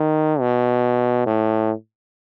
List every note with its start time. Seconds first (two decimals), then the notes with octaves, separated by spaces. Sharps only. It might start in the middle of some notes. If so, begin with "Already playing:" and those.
Already playing: D#3
0.40 B2
1.26 A2